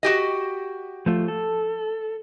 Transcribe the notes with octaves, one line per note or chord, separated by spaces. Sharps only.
F#4 G4 D#5
F3 A3 F4
A4